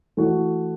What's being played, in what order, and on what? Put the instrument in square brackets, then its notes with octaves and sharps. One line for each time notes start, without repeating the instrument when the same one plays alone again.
[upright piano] E3 A3 F#4